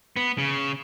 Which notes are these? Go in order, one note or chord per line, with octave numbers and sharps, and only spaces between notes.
B3
C#3